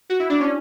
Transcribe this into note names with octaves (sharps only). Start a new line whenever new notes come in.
F#4
E4
D4
C#4